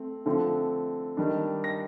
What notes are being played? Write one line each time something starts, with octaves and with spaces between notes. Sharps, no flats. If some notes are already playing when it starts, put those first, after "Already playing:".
Already playing: A3 C4
D3 F3 A3 C4
D#3 G3 D4
A#6